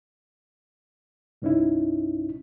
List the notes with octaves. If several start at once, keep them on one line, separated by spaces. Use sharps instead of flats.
C2 G2 C#4 D#4 E4